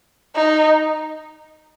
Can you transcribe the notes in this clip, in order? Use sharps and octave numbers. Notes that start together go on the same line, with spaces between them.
D#4